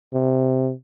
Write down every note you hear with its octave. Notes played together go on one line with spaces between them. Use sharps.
C3